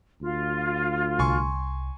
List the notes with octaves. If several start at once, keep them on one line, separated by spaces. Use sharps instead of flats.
D2 F4
C2 G#5 C6 C#6